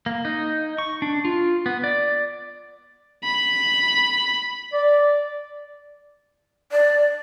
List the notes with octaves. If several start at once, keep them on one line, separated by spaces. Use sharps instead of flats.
A#3
D#4
C#6
D4
F4
B3
D5
B5
D5
D5